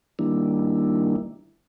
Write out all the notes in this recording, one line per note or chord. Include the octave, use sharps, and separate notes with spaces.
D#3 G3 A#3 D4 E4